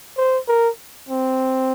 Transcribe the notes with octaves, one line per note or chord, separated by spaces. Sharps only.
C5
A#4
C4